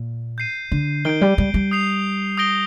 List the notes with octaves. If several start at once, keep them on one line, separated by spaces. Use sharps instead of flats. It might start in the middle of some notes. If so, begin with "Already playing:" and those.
Already playing: A#2
G6 C7 D#7
D3
D#3 G6 D7 G7
G3
G3
G3
D#6 G6 C7 F7
D#6 G6 A#6 D7 G7